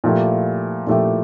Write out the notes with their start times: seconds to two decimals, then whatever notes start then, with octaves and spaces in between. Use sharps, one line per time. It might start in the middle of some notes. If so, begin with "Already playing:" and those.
0.04 A#2 F3 A3 E4 G4
0.87 A#2 F3 A3 E4 G4